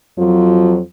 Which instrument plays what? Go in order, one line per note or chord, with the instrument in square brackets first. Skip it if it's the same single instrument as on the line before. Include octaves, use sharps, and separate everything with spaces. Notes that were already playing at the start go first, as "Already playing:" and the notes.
[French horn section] F2 F3 F#3